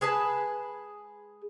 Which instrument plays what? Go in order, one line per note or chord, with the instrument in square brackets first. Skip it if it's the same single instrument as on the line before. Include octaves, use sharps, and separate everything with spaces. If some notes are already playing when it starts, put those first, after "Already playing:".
[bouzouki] G#3 G#4 B4 A5